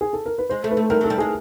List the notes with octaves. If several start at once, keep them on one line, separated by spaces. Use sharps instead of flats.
G#4
A4
A#4
B4
G#3 C5
A3
B4
A3
G3 A#4
F#3
A4
G3
G#3 G#4